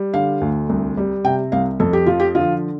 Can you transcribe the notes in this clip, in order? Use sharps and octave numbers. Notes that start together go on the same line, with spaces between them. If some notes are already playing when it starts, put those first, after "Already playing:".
Already playing: G3
D3 F5
D2
C2
G3
C3 G5
C2 F5
F2 A4
G4
F3 F4
G4
D3 F4